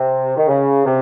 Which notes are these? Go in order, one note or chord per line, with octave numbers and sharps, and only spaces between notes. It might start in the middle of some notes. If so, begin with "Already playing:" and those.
Already playing: C3
D#3
C#3
C3